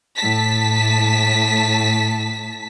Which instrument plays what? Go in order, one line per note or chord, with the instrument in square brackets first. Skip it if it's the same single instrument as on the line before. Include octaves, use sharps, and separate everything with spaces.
[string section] A2 A5 B6